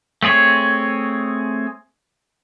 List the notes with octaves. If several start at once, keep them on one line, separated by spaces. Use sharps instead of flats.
A3 C4 G#4 C#5